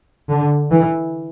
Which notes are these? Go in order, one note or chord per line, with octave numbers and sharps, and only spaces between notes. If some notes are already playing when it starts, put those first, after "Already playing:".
D3
E3